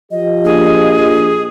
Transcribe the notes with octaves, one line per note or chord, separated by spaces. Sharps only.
F3 G4 D#5
A#1 G#4